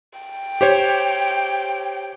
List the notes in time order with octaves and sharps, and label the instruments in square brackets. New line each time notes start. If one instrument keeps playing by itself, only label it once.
[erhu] G5
[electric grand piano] G4 C5 C#5